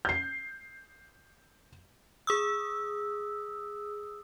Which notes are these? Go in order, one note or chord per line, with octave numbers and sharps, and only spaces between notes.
G6 C7
G#4 D#6 E6